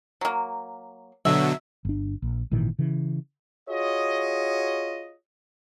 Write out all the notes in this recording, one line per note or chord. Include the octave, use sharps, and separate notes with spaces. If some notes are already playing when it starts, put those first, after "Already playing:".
F#3 A#3
B2 D3 F#3 E5
G1 D4
A#1
G#1 A#2 D#3 E3
C#3 E3
F4 F#4 G#4 C#5 D#5